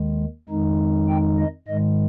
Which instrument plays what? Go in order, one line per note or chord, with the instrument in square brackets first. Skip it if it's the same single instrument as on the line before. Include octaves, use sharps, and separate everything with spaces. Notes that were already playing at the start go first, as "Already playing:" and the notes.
Already playing: [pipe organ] D#2 D#3 G#3
F2 D#3 G#3 D#4
G5
D#5
G#2 D#3 G#3 D#5